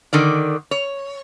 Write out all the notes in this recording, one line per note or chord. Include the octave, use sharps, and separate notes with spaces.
D3 D#3 D5
C#5